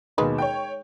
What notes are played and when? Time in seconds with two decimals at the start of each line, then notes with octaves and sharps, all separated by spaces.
0.18 D#2 B2 G#3 D#4 B4
0.38 C#5 G5